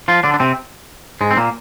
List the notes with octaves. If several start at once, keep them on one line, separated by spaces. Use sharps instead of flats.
F3 F4
D3 D4
D4
C3 C4
G#2 G#3
C4
A#2 A#3